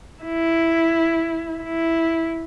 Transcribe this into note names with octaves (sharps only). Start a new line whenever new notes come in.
E4
E4